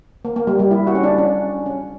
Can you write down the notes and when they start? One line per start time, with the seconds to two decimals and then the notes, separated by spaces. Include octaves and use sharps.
0.25 A#3
0.36 A#3
0.47 G3
0.59 G3
0.71 E4
0.87 F#4
0.95 C#4
1.03 D4
1.18 C#4
1.66 C#4